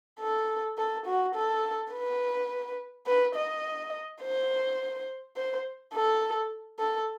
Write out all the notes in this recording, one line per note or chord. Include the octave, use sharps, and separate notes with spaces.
A4
A4
F#4
A4
B4
B4
D#5
C5
C5
A4
A4